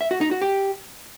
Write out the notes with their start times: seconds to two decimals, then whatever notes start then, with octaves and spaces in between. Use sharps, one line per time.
0.01 E5
0.11 F#4
0.21 D#4
0.31 F#4
0.42 G4